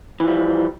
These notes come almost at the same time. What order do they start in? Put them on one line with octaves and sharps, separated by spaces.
E3 F3 G3